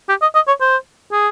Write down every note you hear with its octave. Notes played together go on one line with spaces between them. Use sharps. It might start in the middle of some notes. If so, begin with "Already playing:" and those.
G4
D#5
D#5
C#5
C5
G#4